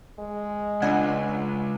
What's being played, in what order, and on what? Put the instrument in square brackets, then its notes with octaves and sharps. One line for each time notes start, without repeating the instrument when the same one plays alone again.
[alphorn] G#3
[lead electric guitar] C#2 [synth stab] D4 F#5 G#5